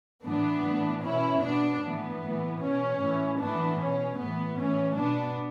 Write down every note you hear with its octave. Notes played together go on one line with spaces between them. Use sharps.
A2 E3 B3 D4
A2 E3
B2 C#4 E4
B2 B3 D4
A2 E3 B3
A2 E3
B2 C#4
A2 E3
A2 E3 B3 D4
B2 C#4
A2 E3 B3
A2 E3 C#4
B2 B3 D4